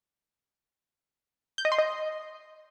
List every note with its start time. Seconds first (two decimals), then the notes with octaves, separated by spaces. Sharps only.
1.58 G6
1.65 D#5
1.72 C6
1.78 D#5